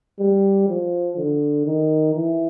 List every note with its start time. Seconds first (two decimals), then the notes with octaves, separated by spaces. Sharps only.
0.20 G3
0.69 F3
1.18 D3
1.66 D#3
2.14 E3